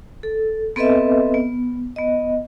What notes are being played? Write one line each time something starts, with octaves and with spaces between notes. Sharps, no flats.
A4
B3 C4 A4 B4 D#5 E5
B3
B3 D#5